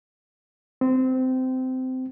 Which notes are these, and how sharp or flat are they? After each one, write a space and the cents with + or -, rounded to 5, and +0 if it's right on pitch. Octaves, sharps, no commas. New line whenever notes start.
C4 -20